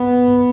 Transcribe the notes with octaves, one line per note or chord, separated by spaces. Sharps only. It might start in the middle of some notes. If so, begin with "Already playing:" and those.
Already playing: B3